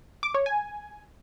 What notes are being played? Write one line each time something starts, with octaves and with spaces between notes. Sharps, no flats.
D6
C#5
G#5